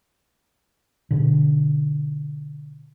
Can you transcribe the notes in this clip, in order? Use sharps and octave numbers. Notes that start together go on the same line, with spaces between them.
B2 D3